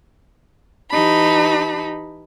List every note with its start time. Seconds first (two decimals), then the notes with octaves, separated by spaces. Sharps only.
0.90 E3 D#4 G4 A5 B5